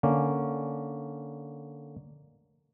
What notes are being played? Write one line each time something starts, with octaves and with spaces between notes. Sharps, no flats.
D3 A#3 C#4